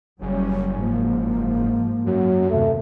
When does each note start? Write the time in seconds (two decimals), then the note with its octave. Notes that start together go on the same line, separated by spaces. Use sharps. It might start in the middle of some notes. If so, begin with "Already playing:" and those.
0.22 F#1 F#3 G3 C#4
0.79 G#2 F3 A#3
2.06 F#2 F#3
2.50 D#2 C3 A3